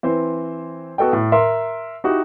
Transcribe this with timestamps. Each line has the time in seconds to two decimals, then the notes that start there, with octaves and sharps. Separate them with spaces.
0.03 E3 C4 C5
0.98 B3 F#4 A4 D#5 G5
1.13 A2
1.32 A#4 E5 C6
2.04 D#4 E4 F#4 G4